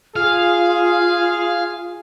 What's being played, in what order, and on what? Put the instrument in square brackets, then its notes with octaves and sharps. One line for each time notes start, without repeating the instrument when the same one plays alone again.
[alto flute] F4 [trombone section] G#4 [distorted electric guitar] F5